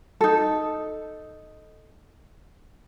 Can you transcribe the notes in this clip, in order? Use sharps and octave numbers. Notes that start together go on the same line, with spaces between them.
D#4 A4